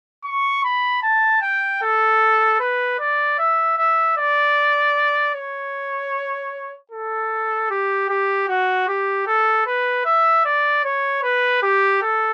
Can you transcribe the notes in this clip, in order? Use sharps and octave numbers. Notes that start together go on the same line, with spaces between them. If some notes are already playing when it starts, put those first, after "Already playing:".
C#6
B5
A5
G5
A4
B4
D5
E5
E5
D5
C#5
A4
G4
G4
F#4
G4
A4
B4
E5
D5
C#5
B4
G4
A4